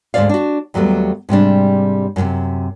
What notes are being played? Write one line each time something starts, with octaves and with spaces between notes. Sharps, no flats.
D2 G#2 D#3 C5 D5 F5
D4 F#4
D#2 F#3 G3 A3 B3
G#2 C3 G3 D4
F#2 A2 C3